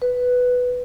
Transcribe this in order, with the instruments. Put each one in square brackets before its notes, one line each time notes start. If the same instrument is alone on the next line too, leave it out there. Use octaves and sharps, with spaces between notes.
[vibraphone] B4